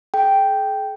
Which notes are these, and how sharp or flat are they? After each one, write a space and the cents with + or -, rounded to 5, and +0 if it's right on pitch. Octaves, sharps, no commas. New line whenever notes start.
G#4 +45 G5 +0